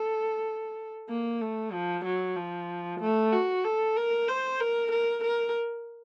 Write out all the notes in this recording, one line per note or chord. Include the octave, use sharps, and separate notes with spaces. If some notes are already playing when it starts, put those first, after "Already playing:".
Already playing: A4
A#3
A3
F3
F#3
F3
A3
F#4
A4
A#4
C5
A#4
A#4
A#4